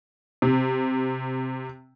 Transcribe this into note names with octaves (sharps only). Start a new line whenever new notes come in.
C3